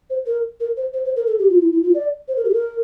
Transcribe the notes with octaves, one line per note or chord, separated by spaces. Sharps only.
C5
A#4
A#4
C5
C5
C5
A#4
A4
G4
F4
E4
E4
F4
D5
C5
A#4
G4
A4
A#4